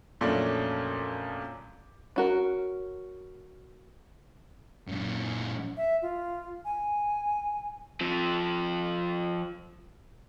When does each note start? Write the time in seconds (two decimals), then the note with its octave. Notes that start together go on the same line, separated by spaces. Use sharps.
0.21 F2 A#2 F#3 A3 C#4 D4
2.16 C#4 F#4 A#4
4.87 F#2 A#2
5.77 E5
6.02 F4
6.65 G#5
8.01 F3 C4